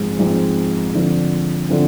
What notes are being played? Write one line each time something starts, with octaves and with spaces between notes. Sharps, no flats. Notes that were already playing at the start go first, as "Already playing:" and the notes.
Already playing: G#2 F3 G#3 C4
G#2 F3 G#3 C4
D3 F3 C4
D3 F3 C4